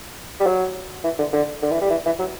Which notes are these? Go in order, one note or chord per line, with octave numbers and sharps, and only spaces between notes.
G3
F#3
E3
D3
D3
D3
E3
G3
E3
E3
F#3